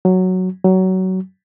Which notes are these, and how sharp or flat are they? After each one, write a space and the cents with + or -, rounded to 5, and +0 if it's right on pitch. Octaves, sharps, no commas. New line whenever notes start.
F#3 +0
F#3 +20